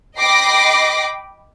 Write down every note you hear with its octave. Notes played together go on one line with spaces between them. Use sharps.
D#5 G5 B5 D6 A#6 C7